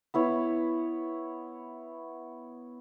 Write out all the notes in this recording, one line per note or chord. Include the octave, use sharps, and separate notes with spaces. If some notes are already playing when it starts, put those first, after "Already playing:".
B3 E4 C#5